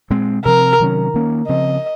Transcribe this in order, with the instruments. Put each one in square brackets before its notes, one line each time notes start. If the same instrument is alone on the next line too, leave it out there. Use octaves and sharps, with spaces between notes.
[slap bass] A#2 G#3 C4
[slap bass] C3 F3 C4 [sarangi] A#4
[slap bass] C3 D#3 F#3 C#4
D#3 A#3 C#4
[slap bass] C#3 F3 C4 [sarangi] D#5